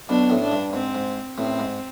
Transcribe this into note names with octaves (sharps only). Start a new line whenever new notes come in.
B1 B2 D4
A1 A2
D4
G2
G#2 C4
G#2
A1 A2 C4
G#2